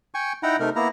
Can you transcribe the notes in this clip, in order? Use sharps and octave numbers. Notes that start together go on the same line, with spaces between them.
G5 G#5 C#6
D#4 E4 F#5 G5 A#5
C3 A3 D#4 A#4
A#3 B3 E4 A#5